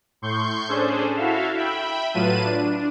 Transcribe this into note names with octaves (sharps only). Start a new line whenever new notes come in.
A2 C6 C#6 G6
C#4 D4 G#4 A4 C5
E4 F#4 A4 E5 F5
E5 G5 B5
A2 F#3 F4 B4 A5 D#7
D4